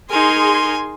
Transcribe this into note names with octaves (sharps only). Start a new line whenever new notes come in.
D#4 G#4 A#4 G#5 C6